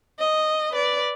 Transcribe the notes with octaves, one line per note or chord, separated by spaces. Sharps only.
D#5
B4 D5